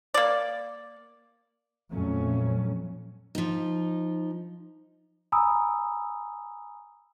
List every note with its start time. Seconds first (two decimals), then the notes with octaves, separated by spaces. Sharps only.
0.14 A#3 D5
1.90 F2 A#2 F#3 A3 C#4
3.35 F3 D#4
5.32 G#5 A#5 B5 D#6 E6